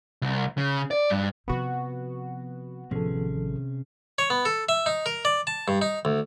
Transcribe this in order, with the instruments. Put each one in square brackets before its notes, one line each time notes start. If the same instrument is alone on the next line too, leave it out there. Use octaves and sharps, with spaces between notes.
[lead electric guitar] C2
C#3
D5
G2
[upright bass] C3 F3 [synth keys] B3 F#4
[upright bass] A1 D#3 [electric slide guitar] C3 C#4 G#4 [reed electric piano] F3 A4
[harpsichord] C#5
B3
A4
E5
D#4
A#4
D5
A5
G2
D#4
D2